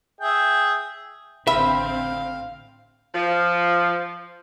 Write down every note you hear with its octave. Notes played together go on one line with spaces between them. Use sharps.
G#4 E5 G5
A1 D3 C4 E5 F5 B5
F3